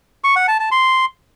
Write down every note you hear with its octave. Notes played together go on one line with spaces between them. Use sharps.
C#6
F#5
A5
A5
C6